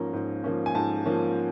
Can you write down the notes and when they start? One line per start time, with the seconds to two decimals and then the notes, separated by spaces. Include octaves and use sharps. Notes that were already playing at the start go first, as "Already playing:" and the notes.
Already playing: G#2 F3 A#3 C#4 A#5
0.13 G#2
0.44 F3 A#3 C#4
0.66 G#5
0.75 G#2 A5
1.05 F3 A#3 C#4